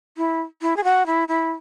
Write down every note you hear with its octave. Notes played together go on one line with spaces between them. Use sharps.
E4
E4
G#4
F#4
E4
E4